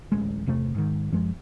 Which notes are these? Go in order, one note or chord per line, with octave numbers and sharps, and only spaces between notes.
D1 A1 G#3
G1 E2 C3 A3
G#2 D#3
F#2 F3 G#3